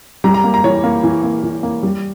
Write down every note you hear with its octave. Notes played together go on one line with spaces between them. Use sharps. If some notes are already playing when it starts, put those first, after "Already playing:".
G3 A#5
A#5
A#3
A#5
E3 C#5
A#3
E3
A#3
E3
A#3
G3